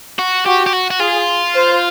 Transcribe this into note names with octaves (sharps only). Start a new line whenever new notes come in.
F#4
F#4 G4
G4
F#4
F#4
F4 G#4
C5